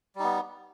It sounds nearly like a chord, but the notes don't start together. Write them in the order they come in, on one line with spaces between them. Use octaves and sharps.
G3 D#4 B3